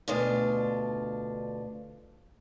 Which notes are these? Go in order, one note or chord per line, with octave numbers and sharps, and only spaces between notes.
D2 B2 D4 F4